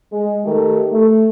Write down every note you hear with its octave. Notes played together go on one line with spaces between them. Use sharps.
G#3
D#3 A3 G4 A4 A#4
A3